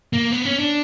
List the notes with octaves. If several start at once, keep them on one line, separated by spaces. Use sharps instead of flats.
A#3
B3
C#4
D4